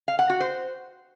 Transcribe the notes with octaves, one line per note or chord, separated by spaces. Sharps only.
F5
F#5
F#4
C5